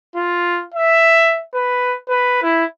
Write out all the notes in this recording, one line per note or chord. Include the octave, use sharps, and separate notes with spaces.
F4
E5
B4
B4
E4